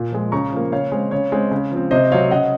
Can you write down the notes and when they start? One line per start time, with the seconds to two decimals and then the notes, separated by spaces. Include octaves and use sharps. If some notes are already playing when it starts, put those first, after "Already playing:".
Already playing: A#2
0.12 F3 G#3
0.32 C#3 A#5 C#6
0.52 F3 A#3
0.72 C#3 C#5 F5
0.92 G#3 C4
1.11 C#3 C#5
1.32 G#3 C4
1.51 C#3
1.72 F3 C4
1.91 C3 C5 D#5
2.12 F#3 C4 C#5 F5
2.31 C#3 D#5 F#5